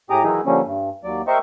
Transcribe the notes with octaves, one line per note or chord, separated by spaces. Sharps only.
A2 G4 G#4 A#5 D6 D#6
D#3 E3 F#3 D#4 E4 G#4
D3 F3 G3 A#3 C#4
G2
D#2 F#3 D5
G4 A#4 C5 D#5 E5 C#6